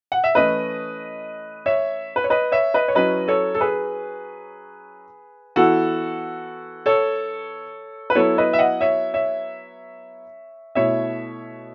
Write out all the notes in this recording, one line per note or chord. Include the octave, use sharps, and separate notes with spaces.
F#5
E5
E3 A3 C#4 E4 B4 D#5
C#5 E5
B4
C#5
B4 D#5
C#5 E5
B4 D#5
C#5
F#3 C#4 E4 B4 D#5
A4 C#5
A4
G#4 B4
E3 B3 E4 F#4 A4
A4 C#5
B4
F#3 B3 E4 A4 C#5
B4 D#5
E5
D#5 F#5
C#5 E5
C#5 E5
B2 A3 E4 C#5 E5